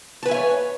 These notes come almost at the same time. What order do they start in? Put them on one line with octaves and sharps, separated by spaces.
A5 B4 G#5 E5 C#5